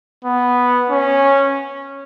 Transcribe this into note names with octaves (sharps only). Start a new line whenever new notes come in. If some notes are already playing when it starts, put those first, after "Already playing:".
B3
C#4